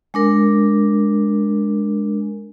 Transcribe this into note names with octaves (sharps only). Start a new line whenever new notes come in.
G#3 D4 A#4